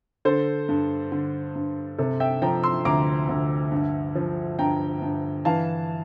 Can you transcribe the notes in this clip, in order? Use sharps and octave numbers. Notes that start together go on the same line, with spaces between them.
D3 A4 C5
G2
D3
G2
C3 A4
E5 G5
F3 G5 A#5
C6 E6
D2 A#5 D6
D2
G2
F3
G2 G5 A#5
G2
E3 F5 A5